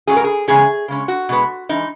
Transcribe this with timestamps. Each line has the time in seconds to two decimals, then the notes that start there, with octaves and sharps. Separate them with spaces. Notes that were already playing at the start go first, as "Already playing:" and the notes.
0.07 G#2 F#3 C#4 G#4
0.16 A#4
0.24 G#4
0.48 E2 C#3 G#3 C#4 G#4
0.88 C#3 G#3 C#4
1.08 F#4
1.29 B2 G#3 B3
1.69 E3 G#3 D#4